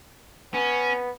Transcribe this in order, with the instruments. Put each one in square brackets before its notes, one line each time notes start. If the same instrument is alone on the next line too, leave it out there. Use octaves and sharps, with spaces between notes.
[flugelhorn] B3 [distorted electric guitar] C#4